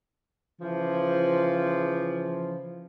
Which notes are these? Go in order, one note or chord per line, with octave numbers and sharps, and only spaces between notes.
C#3 E3 F3